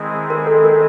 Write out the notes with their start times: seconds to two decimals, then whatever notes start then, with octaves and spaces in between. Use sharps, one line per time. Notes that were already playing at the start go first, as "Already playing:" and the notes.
Already playing: D#3 G#3 C4 E4 G#4
0.30 A#4
0.47 A4
0.65 A#4